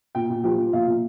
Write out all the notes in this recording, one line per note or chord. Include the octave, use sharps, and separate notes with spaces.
A#2 G5
A#2
F3 G4
F3
A#2 F5
A#2